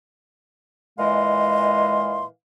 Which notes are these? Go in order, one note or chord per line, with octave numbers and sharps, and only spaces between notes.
A#2 E3 G#3 D#5 F5 C6